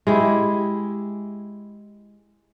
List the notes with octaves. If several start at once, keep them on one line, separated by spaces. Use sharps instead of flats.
G#3 E4 G4